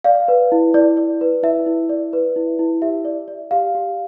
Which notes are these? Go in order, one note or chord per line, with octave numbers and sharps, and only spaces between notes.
D5 F5
B4
E4
E4 D5
D5
B4
E4 E5
E4
D5
B4
E4
E4
G4 E5
D5
D5
G4 F5
G4